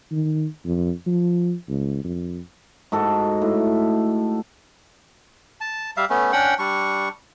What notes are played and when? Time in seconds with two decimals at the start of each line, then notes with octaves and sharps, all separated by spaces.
0.12 D#3
0.66 F2
1.06 F3
1.69 C#2
2.05 F2
2.92 G#2 F#4 A4
3.42 A2
5.61 A5
5.97 G3 E5 F5
6.10 A3 B3 C#4
6.32 C#4 D4 F#5 G5
6.59 G3 D4 C#6